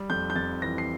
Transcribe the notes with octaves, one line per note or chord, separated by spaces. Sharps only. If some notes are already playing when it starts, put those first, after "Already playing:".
Already playing: G3
F2 G6
G6
F2 A6
E3 A#6
C7